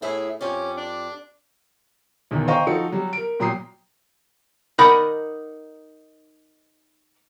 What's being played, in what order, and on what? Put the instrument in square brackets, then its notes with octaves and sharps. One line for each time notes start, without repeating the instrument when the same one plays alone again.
[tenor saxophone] A2 [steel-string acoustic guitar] E4 G#4 E5
[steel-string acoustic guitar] F2 G4 D5 [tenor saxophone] C#4
[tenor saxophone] D4
[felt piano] B1 E2 D3 D#3
C5 D#5 F5 G5 A#5 C#6
F3 D#4 F#4 A4 C#7
F#3 G3
A#4 D7
A#2 F#3 G5 A#5 D#6 C7
[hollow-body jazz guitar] D#4 A#4 D5 D#5 F#5 B5